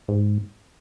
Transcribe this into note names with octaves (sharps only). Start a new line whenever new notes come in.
G#2